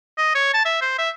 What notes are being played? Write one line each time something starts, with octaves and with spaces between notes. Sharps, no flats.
D#5
C#5
A5
E5
C5
E5